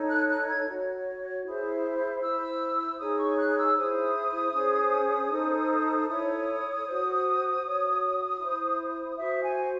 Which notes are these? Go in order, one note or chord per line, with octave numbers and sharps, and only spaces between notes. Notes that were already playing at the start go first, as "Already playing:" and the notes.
Already playing: D#4 A4 C#5
F#6
F#6
G#6
F#4 C#5
E4 G#4 C5
E4 C5 E6
D#4 G#4 C#5 D#6
C#6
F#6
E6
E4 G#4 C5 D#6
C#4 G#4 C5
D#4 A4 C5
E4 A4 C#5 D#6
F#4 C5
F#4 C#5
E4 C5
F#4 C5 E5
G#5